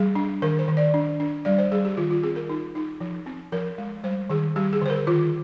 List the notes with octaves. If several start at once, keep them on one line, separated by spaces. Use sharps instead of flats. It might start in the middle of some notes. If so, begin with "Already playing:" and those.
Already playing: G3 G#4
D4
D#3 A#4
C5
D#3
D5
D4
D4
G3 D5
C5
G3 G#4
G4
D#3 F4
F4
C4 G#4
A#4
D#4
D#4
F3
C4
F3 A#4
G#3
G3 C5
D#3 G#4
G3 G4
G#4
D3 C5
A#4
D#3 F4